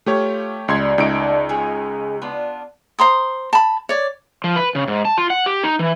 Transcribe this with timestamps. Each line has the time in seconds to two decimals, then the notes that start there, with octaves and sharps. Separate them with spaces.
0.06 A3 F4 G4 C#5
0.68 C#2 G3 C6 G#6
0.98 C#2 A#2 A3 D4 D#4 D7
1.49 G#3 C#4 G#4
2.22 B3 D4 F4
2.99 C5 A#5 C6 D#6
3.53 A5 B5
3.89 C#5 D5
4.44 F3
4.56 B4
4.75 C#3
4.88 G#2
5.05 A5
5.18 F4
5.30 F#5
5.46 G4
5.63 D#4
5.79 E3